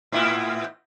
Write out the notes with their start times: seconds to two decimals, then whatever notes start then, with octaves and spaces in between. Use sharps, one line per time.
0.12 A2 B3 E4